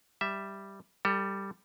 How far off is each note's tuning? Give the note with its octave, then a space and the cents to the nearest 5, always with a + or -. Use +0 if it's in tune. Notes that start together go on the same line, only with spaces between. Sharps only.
G3 +0 E5 +0
G3 +0 A4 +30